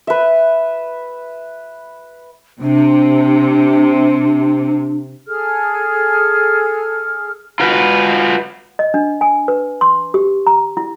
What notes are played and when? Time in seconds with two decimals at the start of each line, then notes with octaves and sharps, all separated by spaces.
0.07 B4 E5
2.61 C3 D4
5.27 G#4 A4 F6
7.60 F4 F#4 B4
8.79 D#5
8.94 D4
9.21 G#5
9.48 B4
9.81 C6
10.14 G4
10.47 A#5
10.77 E4